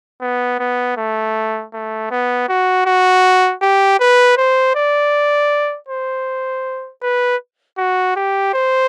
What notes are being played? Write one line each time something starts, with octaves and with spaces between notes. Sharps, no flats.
B3
B3
A3
A3
B3
F#4
F#4
G4
B4
C5
D5
C5
B4
F#4
G4
C5